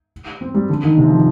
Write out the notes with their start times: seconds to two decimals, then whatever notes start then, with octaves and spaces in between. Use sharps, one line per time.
0.41 C4
0.54 G3
0.69 D3
0.84 D#3
0.98 C3
1.08 F3